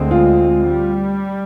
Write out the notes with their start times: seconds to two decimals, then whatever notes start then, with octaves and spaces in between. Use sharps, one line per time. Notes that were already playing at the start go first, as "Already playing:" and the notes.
Already playing: D2 D3 G#3 C4
0.11 F4
0.66 G3